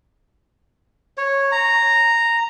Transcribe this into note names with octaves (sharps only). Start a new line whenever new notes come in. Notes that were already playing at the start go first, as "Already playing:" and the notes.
C#5
A#5